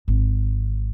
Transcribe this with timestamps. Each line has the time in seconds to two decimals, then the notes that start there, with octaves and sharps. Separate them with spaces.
0.08 G#1